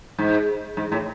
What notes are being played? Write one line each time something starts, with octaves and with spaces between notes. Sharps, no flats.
G#2
G#2
A2